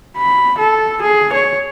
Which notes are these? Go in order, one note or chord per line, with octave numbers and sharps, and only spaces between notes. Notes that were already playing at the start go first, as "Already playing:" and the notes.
B5
A4
G#4
C#5